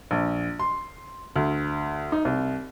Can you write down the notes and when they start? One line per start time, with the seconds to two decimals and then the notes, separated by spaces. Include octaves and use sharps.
0.11 A#1
0.60 C6
1.36 D2
2.12 D#4
2.25 C2